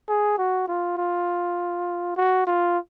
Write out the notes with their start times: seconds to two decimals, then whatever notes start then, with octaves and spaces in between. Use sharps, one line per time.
0.09 G#4
0.38 F#4
0.68 F4
0.98 F4
2.17 F#4
2.47 F4